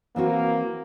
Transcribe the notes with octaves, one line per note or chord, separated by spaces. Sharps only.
E3 A#3 C4 F#4